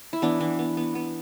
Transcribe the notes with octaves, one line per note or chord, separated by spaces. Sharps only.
E4
E3 B3 D4
E3
B3
B3
B3